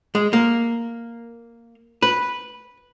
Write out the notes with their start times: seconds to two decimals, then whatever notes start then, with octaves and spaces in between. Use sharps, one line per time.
0.15 G#3
0.33 A#3
2.02 B4